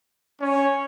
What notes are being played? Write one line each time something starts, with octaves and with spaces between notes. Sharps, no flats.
C#4 C#5